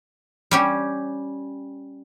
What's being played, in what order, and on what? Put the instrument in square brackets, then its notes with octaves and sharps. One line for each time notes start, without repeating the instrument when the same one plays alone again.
[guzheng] G3 C#4 G4